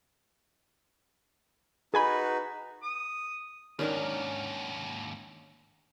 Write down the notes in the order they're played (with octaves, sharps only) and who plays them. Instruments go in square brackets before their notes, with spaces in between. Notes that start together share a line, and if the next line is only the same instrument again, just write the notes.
[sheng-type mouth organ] D#4 F#4 B4 [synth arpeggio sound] G#4 G#5 B5
[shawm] D#6
[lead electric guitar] D#2 G#2 [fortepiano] D#3 [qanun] C#4 D4 A#4